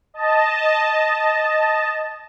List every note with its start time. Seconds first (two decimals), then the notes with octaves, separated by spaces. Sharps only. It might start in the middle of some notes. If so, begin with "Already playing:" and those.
0.14 D#5 A5